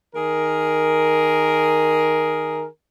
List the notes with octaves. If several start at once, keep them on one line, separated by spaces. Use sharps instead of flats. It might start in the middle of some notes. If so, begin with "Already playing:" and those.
D#3 G#4 A#4